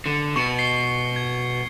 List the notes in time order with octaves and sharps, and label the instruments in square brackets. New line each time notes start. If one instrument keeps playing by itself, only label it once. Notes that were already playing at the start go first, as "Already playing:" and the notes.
[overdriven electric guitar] D3
[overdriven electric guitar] B2 [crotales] C#6 C#7
[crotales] C7 C#7 G7
G#6